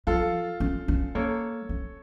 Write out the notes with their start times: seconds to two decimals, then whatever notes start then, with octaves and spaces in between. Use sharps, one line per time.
0.07 F3 F4 A4
0.60 C#4
0.88 C#4
1.15 A#3 A4 C#5
1.69 C#4